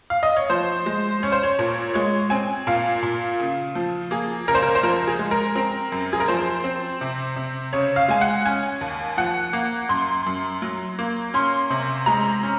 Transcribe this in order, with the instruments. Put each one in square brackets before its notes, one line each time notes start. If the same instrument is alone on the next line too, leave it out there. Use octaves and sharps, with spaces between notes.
[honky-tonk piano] F5
D#5
C#5
F3 C5
G#3
C#4 C#5
C5
C#5
A#2
G#3 C#5
C4 G#5
A#2 F5
A#2
C#3
F3
A#3 G#4
C#2 A#4
C5
A#4
C5
F3 A#4
G#4
G#3
A#4
C4
F#2
G#4
A#4
F3 C5
C4
C3
C3
C#3 C#5
F5
G#3 G#5
F#5
C#4 G#5
D#2
F3 F#5
A#3
F#2 C6
F#2
F#3
A#3
C#4 C6
C3
G#3 A#5
C#4